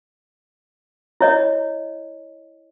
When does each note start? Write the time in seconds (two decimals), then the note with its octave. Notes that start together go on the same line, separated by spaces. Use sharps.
1.21 E4 C#5 D#5